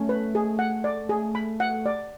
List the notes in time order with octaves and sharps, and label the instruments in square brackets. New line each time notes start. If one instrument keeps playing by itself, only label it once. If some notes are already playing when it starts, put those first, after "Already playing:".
Already playing: [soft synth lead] A3 [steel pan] C#4
[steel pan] B4
G#4
F#5
D5
G#4
B5
F#5
D5